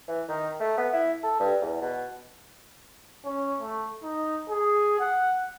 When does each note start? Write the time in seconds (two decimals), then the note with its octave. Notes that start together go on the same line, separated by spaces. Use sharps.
0.08 E3
0.29 D#3
0.60 A3
0.77 B3
0.93 E4
1.23 A4
1.40 G2
1.62 E2
1.82 B2
3.25 C#4
3.61 A3
4.03 D#4
4.49 G#4
5.00 F#5